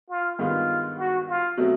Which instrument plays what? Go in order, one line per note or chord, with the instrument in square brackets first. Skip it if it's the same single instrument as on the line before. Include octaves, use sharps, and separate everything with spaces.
[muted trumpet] F4
[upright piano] G2 D#3 G#3 B3 [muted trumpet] F4
[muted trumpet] F#4
F4
[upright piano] B2 F#3 A3 C4